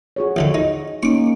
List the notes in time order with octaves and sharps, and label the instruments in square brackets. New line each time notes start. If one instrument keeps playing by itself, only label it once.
[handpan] F#4 G#4 C#5
[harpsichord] A1 D2 D3
D#4
[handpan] A#3 C#4 D#4 [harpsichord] C#6 D6